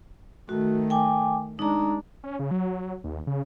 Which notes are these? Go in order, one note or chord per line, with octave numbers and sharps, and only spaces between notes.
D#3 A3 F#4
G5 G#5 D6
G#3 D4 D#4 A#5
C#4
C#3
F#3
D#2
C#3